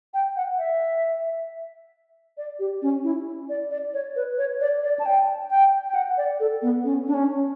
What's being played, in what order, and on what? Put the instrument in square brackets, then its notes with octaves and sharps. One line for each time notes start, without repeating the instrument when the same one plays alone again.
[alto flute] G5
F#5
E5
D5
G4
C#4
E4
D5
D5
C#5
B4
C#5
D5
D5
A5
G5
G5
G5
F#5
D5
A4
B3
C#4
D4
C#4